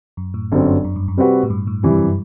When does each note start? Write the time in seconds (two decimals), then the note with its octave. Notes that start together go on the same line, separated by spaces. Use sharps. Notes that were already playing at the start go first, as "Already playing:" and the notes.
0.17 F#2
0.34 A2
0.52 G1 F#2 F#3 C4
0.84 F#2
0.96 G2
1.08 F#2
1.17 C3 G3 C4 F#4 B4
1.43 A2
1.50 G2
1.67 A2
1.83 F#2 C3 E3 G3
1.91 G2
1.99 F#2